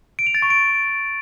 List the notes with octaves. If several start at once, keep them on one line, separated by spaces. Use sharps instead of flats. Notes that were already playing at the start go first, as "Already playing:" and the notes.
D7
F7
A6
C#6
D7